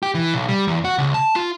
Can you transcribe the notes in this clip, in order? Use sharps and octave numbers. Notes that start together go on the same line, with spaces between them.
G4
E3
B1
G3
E2
F#4
C#2
A5
F4